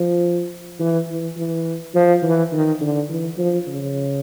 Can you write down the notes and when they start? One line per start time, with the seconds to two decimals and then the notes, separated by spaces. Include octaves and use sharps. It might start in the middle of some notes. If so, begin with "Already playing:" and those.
Already playing: F3
0.79 E3
1.08 E3
1.37 E3
1.95 F3
2.23 E3
2.52 D#3
2.81 D3
3.09 E3
3.38 F3
3.67 C#3